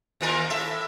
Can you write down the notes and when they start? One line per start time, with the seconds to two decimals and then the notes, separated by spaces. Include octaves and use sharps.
0.21 D#2 F4 A#4
0.50 A2 A4 E5